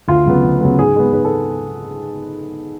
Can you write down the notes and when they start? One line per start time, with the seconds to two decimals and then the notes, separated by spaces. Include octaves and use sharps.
0.08 D2 F4
0.26 C#3 F#3 B3
0.43 D2
0.61 C#3 F#3 B3
0.78 G#2 G#4
0.96 G#3 B3
1.13 G#2 B4
1.25 A4